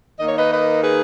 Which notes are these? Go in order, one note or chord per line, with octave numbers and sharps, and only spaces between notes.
D#3 A#3 D#4 D#5
C#5
B4 D#5
B4 D#5
G#4 B4